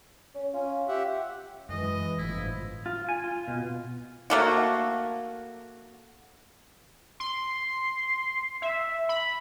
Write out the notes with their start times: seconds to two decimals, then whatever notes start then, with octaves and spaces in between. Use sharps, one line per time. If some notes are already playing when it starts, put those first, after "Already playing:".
0.35 C#4
0.54 C#4 F4
0.88 G4 E5 F#5
1.69 F#2 E3 G#3 D#5
2.18 G1 A2 F3 E4
2.86 F4
3.09 G#5
3.24 F4
3.48 B2
4.30 A3 A#3 F#4
7.20 C6
8.62 E5
9.09 B5